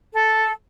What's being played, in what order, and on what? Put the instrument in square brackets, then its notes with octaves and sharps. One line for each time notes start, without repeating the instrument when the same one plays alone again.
[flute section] A4